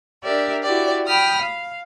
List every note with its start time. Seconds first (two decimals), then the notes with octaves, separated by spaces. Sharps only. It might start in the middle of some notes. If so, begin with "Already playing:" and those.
0.23 D4 G4 A#4 D5 E5
0.63 E4 F#4 G4 D5
1.07 G5 B5 D#6 F6
1.41 F5